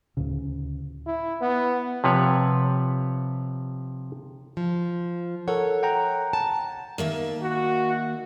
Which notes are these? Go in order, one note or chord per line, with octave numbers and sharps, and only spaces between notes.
D2 A2 C#3
E4
B3
C3 F3 B4 C#5
F3
A4 A#4 C#5 F#5
F#5 G5 A#5
A5
D#3 A#3 E5
F#4